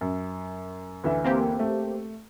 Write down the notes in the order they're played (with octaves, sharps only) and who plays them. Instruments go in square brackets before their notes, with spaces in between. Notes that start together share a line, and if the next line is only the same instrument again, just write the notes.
[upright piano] F#2
D2 E3 E5
[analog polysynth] A#3 C4 G4
[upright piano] A3